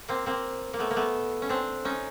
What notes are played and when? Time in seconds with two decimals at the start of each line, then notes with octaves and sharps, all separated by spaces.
0.08 A#3 C4
0.26 A#3 C4
0.74 A#3
0.79 A3 B3
0.91 A#3
0.96 A3 B3
1.42 C#4
1.49 C4 D4
1.85 C#4 D#4